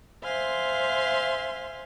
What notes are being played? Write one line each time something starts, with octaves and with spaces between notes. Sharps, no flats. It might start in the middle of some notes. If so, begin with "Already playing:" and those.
C5 E5 F5 G#5 C6